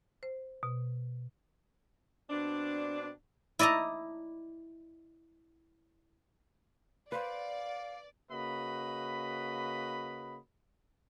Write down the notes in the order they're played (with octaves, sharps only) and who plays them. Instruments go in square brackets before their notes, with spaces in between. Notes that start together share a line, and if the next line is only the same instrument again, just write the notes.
[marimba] C5
B2
[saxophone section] B2 C4 D4
[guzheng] E4 D5 D#5 A5 A#5
[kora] B4 C5 [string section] D5 [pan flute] F5
[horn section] C#3 A#3 F#4 B4 D#5 B5